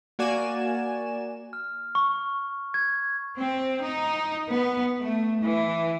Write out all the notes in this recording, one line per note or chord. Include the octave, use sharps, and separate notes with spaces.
A#3 F#4 D5 G#5 E7
F6
C#6
G#6
C4
D#4
B3
A3
E3